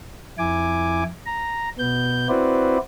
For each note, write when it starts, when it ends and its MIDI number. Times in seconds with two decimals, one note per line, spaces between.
0.38 1.04 41
0.38 1.04 64
0.38 1.04 80
0.38 1.04 86
1.26 1.69 82
1.79 2.28 47
1.79 2.28 59
1.79 2.28 91
2.29 2.78 60
2.29 2.78 64
2.29 2.78 66
2.29 2.78 71
2.29 2.78 72
2.29 2.78 74